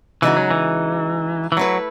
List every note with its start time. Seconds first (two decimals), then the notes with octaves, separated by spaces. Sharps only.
0.22 C#3 E3 G#3 D#4 F#4
0.37 F#3
0.50 E3
1.52 E3
1.57 F#3 A3 E4 B4